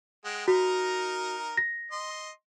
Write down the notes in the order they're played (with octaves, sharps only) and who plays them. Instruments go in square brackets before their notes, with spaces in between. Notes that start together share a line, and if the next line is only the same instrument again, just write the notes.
[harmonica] G#3 F#5 G5
[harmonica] D#4 A#4 A#5 [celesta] F#4
[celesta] A#6
[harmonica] D#5 C6